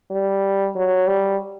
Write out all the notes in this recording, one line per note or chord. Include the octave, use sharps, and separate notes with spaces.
G3
F#3
G3